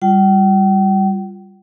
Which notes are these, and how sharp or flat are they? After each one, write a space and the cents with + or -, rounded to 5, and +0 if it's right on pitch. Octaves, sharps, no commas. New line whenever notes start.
G3 +0 F4 +0 G5 -45